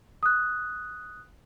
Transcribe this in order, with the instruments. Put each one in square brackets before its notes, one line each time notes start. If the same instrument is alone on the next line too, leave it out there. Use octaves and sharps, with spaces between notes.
[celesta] D#6 F#6